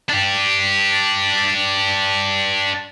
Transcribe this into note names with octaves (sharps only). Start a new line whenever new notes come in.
D4 G4